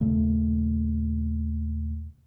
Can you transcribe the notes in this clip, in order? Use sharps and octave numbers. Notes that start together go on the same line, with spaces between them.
D#2 A#2 C#3 A3